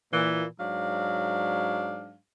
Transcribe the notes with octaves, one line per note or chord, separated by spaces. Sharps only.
A#2 E3
G#2 F#3 D4 F5